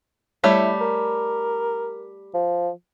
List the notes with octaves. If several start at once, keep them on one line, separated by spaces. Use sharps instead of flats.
G3 A3 E4 C#5
A#4
F3